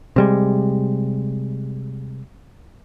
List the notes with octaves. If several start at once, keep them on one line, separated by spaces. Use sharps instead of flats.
C3 G3 G#3